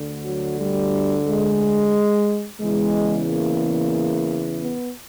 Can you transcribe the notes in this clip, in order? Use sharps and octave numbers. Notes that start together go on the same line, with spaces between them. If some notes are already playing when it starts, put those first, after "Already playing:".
Already playing: D2 D3
F#3
G3
G#3
E2 C#3 E3 G#3
A#3
B3